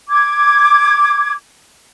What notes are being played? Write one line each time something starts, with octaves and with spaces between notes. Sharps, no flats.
D6 G#6